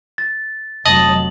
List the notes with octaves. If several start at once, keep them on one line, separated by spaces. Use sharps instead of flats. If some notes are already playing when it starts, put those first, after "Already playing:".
A6
F1 F#3 D#5 A5 D#6 F#7